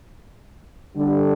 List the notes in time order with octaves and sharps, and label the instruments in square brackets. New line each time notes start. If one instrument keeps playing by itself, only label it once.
[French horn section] D3 G3 D4